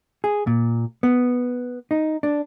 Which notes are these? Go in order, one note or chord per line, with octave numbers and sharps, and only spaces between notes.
G#4
A#2
B3
D#4
D4